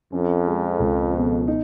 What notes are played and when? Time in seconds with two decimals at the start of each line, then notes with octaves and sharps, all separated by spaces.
0.12 F2 C#4
0.47 G#3
0.80 C#2
1.14 B2
1.48 D#4